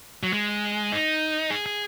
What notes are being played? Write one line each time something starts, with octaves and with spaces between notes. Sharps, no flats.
F#3
G#3
D#4
G#4
G#4